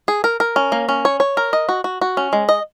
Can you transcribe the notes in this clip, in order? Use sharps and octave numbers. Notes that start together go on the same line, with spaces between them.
G#4
A#4
A#4
C#4
A#3
C#4
C#5
C#5
A#4
D#5
F#4
F#4
F#4
C#4
G#3
D#5